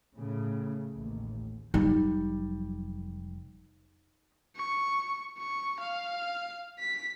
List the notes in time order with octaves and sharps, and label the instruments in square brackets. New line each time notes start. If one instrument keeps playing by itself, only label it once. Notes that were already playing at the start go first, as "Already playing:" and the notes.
[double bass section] A2 C#3
A1 D#2
[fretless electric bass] F1 F#3 G3 [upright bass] D#4
[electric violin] C#6
C#6
F5
B6